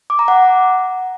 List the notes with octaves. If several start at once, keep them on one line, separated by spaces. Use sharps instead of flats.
D6
A#5
F#5